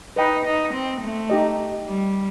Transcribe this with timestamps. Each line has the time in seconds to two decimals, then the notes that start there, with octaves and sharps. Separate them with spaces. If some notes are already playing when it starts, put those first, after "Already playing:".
0.16 D#4 B4 D#5 G5 B5
0.45 D#4
0.74 C4
1.01 A3
1.30 D#4 G4 D#5
1.87 G3